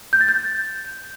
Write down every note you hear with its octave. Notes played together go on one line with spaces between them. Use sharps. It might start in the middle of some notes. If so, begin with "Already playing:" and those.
G6
A6
G6